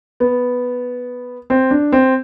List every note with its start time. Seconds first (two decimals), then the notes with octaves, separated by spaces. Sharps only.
0.20 B3
1.50 C4
1.71 D4
1.92 C4